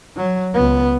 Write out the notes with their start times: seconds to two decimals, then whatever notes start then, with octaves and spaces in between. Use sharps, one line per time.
0.16 F#3
0.54 C#2 B3